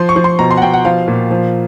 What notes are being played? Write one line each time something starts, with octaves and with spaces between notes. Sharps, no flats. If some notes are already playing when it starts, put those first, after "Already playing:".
Already playing: F3 C6
C#6
F3
C6
B2 A#5
C6
F#5
B2 G5
F#5
F3 F5
A#2
F3